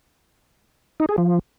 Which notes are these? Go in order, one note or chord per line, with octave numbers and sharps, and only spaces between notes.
D#4
G#4
F3